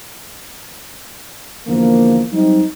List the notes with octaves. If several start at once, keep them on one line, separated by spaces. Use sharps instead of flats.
E2 D3 F3 A#3
F#3 G3 C4 D#4